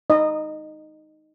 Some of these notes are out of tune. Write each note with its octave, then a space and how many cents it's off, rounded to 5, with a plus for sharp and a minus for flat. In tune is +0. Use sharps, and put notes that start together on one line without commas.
D#4 +0 D#5 -20